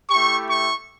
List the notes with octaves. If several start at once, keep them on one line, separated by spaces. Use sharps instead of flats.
A3 E4 G4 C#6
C#6